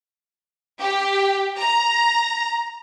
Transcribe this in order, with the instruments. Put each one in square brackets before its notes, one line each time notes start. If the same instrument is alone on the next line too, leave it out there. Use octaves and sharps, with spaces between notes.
[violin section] G4
A#5